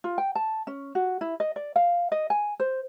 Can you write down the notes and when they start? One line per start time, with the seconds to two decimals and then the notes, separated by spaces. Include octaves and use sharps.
0.04 F4
0.18 G5
0.35 A5
0.67 C#4
0.95 F#4
1.21 E4
1.40 D#5
1.56 D5
1.76 F5
2.12 D#5
2.30 G#5
2.60 C5